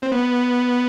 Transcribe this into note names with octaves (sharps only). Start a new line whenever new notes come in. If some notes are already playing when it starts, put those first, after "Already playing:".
C4
B3